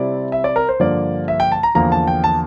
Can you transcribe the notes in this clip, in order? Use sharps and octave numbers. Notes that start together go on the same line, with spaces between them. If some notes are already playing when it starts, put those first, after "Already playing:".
Already playing: C3 G3 C4 E4 D5
E5
D5
A#4
C5
G2 D3 F3 A#3 D5
E5
G5
A5
A#5
E2 D3 F3 A#3 A#5
A5
G5
A5